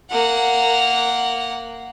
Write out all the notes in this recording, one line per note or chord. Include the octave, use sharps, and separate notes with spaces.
A#3 F#5